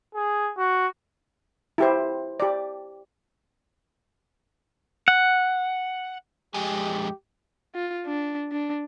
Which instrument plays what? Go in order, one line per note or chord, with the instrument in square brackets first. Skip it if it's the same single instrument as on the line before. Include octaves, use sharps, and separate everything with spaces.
[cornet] G#4
F#4
[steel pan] E4 G4 C5
G4 D5
[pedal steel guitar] F#5
[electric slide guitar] F2 G#3 G#5 [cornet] G4
[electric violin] F4
D4
D4